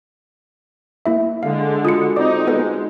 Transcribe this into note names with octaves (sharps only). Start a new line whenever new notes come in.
A#3 E4 E5
D3 G#3 F5
F4 F#4 D#6 C#7
C4 D#4 D5 D6
G#3 B3 A4 B4